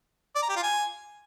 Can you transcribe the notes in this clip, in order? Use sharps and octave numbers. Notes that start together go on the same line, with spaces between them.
D5
A#5
G4
F4
G#5